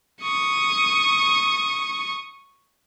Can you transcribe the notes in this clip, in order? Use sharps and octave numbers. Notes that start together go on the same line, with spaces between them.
C#6 D#6